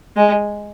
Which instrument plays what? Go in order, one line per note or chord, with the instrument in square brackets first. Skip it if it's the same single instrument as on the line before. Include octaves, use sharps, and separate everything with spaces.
[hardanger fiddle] G#3